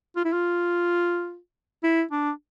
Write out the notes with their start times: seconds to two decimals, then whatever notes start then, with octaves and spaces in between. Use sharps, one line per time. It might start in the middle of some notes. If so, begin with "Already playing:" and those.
0.16 F4
0.25 E4
0.33 F4
1.83 E4
2.11 D4